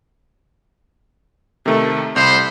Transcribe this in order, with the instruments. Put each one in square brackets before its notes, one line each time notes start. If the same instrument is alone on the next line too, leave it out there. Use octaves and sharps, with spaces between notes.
[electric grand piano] C3 D#3 [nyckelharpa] A3
[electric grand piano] C2 [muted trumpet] C5 [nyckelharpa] B5 C6